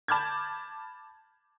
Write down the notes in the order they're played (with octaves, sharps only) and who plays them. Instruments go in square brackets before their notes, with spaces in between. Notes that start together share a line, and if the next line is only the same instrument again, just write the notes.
[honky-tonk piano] A5 B5 D6 F6 G6 G#6